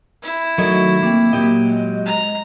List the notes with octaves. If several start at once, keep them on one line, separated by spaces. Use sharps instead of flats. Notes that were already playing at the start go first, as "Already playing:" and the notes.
E4
D#3 F#3 A3 D#4 F#4
A#3 C4
A#2 F#3 G4 D#5
G#3
A#5